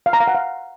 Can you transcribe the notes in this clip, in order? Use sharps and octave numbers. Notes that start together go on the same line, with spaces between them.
F5
A#5
F5
F#5
F5